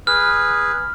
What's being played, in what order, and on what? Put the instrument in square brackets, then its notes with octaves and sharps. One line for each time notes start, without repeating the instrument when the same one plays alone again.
[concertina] G#4 B4 [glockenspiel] F6